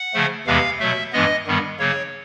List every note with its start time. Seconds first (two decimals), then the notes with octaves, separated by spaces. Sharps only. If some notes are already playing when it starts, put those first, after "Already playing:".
Already playing: F#5
0.14 C#3 F3 A3
0.47 E2 C3 E3 G#3 B3 F5
0.79 B2 F#3 A3 E5
1.13 G2 E3 G#3 B3 D#5
1.47 G2 D#3 G3 B3
1.79 C#3 F#3 A#3 C#5